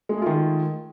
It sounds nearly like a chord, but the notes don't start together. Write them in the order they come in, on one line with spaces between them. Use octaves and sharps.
G#3 A3 G#4 F4 D#3